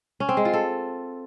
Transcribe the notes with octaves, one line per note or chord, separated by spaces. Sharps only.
C#4
C4
G#3
F4
A4